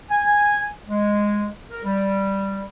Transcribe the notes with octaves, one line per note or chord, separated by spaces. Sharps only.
G#5
G#3
A#4
G3